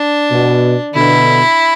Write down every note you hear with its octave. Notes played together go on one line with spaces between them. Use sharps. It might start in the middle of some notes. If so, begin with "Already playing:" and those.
Already playing: D4
B2
B2 D3 E4